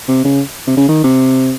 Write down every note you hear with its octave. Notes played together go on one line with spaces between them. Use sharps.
C3
C#3
C3
C#3
D#3
C3